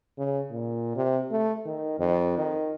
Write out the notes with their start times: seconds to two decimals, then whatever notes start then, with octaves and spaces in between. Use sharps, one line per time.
0.18 C#3
0.51 A#2
0.96 C3
1.31 A3
1.66 D#3
1.99 F2
2.38 D#3